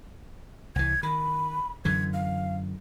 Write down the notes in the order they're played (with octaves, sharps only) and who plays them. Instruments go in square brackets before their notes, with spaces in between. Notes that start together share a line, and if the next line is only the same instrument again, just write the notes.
[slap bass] C2 E3 [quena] G#6
[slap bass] D#3 [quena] B5
[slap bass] F#2 D3 E3 [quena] G#6
[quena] F5